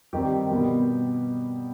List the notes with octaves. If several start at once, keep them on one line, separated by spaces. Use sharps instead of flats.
G2 D#3 G3 C4 G4
B2 G3 B3